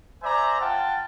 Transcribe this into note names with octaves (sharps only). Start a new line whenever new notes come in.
C5 D5 E5 G#5 A#5
F4 F#5 G5 A5